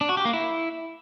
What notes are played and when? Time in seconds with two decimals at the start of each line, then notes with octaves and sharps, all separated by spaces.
0.01 D4
0.09 F#4
0.17 G4
0.25 A#3
0.33 E4